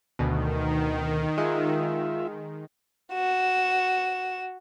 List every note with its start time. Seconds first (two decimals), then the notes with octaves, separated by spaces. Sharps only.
0.19 D2 B2 D#3
1.38 G#3 F4 E5
3.12 F#4 E7